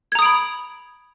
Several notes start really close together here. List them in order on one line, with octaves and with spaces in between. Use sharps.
G#6 A#5 D#6 D7 B5